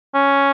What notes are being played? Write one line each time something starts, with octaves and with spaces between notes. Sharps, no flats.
C#4